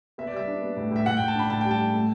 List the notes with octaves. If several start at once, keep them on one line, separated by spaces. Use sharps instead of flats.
B3 E5
D5
G3 E5
D4
B3
A2
A2 E5
A2 F#5
G5
A2
A5
D4 B5
A2 A5
G3 G5
A5
A2
A3